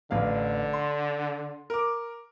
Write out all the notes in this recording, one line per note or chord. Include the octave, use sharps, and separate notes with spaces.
A1 D3 F5
C6
A#4 D6